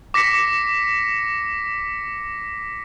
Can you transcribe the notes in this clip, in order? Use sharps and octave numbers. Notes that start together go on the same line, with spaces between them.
D6 A#6 B6 C#7